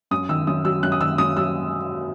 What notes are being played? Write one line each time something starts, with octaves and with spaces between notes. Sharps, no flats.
F#2 D#6
D#3 E6
F#2 D#6
F#3 E6
F#2 F#6
D#6
D#3 E6
F#2 D#6
F#3 E6